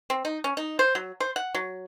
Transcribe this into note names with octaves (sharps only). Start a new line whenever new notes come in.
C4
D#4
C#4
D#4
C5
F#3
C5
F#5
F#3